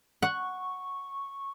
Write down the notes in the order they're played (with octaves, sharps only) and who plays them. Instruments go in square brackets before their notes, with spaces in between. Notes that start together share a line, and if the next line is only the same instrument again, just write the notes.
[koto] F#5 [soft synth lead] C#6